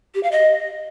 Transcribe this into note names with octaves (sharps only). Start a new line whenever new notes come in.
G4
F5
D#5